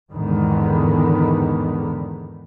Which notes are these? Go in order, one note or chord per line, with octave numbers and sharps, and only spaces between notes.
E2 G#2 D3 D#3 B3